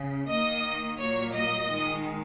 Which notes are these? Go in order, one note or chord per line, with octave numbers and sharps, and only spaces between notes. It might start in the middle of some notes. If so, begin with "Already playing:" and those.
Already playing: C#3
D#3 A#3 D#5
A#2 F#3 A#3 C#5
D#5
D#3 G#3